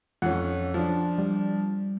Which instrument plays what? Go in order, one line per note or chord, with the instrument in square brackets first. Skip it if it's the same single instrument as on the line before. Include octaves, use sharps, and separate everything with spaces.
[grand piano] F2 C#4 [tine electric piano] F#5
[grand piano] F3 D4
[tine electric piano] G3